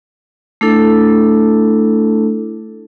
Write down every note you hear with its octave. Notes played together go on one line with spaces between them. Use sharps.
A3 D4 E4 A4